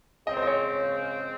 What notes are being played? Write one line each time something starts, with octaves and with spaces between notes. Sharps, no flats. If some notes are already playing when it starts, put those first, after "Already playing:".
C#3 G#3 C4 D#5
C5
D#5
C#5